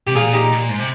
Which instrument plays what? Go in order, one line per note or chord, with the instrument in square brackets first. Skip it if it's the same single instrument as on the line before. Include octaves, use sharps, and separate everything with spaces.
[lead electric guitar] C3 [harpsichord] G4
[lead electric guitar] A#2 [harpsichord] F4 G#4
[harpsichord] D#4 G4
[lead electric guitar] A#2
G#2
C3